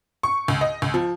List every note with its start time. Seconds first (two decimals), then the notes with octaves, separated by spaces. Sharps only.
0.23 C#6
0.48 C#2
0.61 D#5
0.82 C#2
0.94 F3